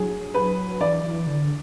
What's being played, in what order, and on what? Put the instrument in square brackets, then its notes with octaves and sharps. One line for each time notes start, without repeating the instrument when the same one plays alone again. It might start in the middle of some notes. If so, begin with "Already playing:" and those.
Already playing: [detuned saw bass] F#3 [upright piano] G#4
[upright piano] B4
[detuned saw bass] E3 [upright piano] D5
[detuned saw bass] E3
D3